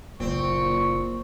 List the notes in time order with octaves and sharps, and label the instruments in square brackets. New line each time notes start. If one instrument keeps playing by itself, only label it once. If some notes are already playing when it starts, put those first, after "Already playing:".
[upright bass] F#1 D3 [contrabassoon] A#2 [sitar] C4 [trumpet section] C#6